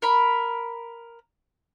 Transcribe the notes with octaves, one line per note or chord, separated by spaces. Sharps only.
A#4 B5